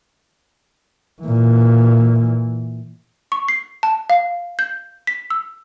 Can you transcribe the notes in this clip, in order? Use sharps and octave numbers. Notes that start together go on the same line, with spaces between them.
A#2 E3
C#6
C7
A5
F5
G6
B6
E6